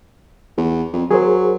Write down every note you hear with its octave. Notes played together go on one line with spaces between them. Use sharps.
E2
F2
F#3 G#4 A#4 C5